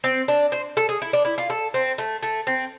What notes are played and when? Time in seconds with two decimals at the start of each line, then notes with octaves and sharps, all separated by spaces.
0.04 C4
0.28 D4
0.52 C5
0.77 A4
0.89 G#4
1.02 E4
1.13 D4
1.25 E4
1.38 F4
1.50 A4
1.74 C4
1.98 A3
2.23 A3
2.47 C4